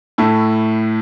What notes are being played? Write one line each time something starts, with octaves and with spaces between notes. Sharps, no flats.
A2 A3 E4